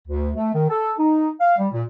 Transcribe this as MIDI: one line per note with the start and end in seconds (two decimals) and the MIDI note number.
0.08 0.30 38
0.36 0.51 57
0.54 0.66 51
0.70 0.94 69
0.99 1.30 63
1.40 1.55 77
1.58 1.68 55
1.72 1.83 46